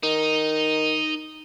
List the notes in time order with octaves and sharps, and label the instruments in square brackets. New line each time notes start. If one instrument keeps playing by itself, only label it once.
[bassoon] D#3 [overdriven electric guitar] D#4